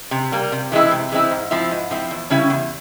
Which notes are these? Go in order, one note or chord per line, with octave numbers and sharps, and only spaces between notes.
C3
G3 A#3
C3
E3 G#3 C4 E4
C3
E3 G#3 C4 E4
G#2
F3 C4 E4
G#2
F3 C4 E4
E2
C#3 G3 C#4 E4
E2